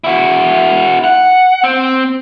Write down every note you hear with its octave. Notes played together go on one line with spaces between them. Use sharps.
E4 F#4
F#5
C4